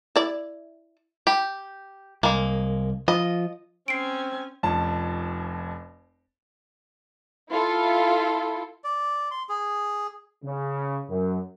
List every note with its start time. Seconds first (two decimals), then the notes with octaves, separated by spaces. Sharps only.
0.16 E4 D5
1.27 G4
2.23 C2 G#3 A#3
3.08 F3 F4 D#5
3.88 C4 C#4 G#5 C7 D7
4.63 F1 F2 C#4 A5
7.50 E4 F4 A4
8.84 D5
9.31 C6
9.49 G#4
10.44 C#3
11.10 F#2